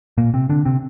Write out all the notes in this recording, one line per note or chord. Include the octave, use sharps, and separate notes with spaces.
A#2 A#3
C3 C4
D3 D4
C3 C4